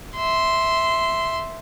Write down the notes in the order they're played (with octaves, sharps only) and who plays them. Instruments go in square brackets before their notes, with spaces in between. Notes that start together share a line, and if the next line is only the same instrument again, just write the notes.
[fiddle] E5 C6